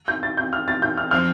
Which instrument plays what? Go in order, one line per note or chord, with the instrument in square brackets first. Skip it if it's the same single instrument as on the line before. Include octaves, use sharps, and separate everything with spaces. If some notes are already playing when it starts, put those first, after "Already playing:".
[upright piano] G6
A6
G6
F6
A6
G6
F6
[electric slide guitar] F3 C4 [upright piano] F6